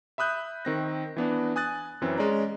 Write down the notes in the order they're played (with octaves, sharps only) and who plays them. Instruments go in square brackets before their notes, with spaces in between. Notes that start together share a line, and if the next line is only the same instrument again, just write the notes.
[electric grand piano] E5 B5 D#6 F#6 G6
D#3 C4 A#6
E3 B3 D4
G#5 D#6 F#6 A6
F#2 E3 C4 C#4
G#3 C#4 D5 A#5